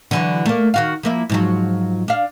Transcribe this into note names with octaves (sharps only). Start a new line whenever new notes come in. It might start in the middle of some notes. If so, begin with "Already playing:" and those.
D3 E3 F#3
A3 A#3
D#3 F#4 F5
F3 A#3 E4
G#2 F3 F#3
D4 F5